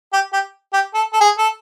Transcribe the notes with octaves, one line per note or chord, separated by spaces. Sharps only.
G4
G4
G4
A4
A4
G#4
A4